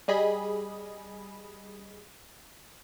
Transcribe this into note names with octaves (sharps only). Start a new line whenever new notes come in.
G3 G#4 D#5 B5